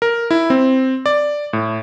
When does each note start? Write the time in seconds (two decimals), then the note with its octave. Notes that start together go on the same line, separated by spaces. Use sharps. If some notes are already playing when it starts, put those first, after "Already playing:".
0.02 A#4
0.31 E4
0.50 C4
1.06 D5
1.53 A2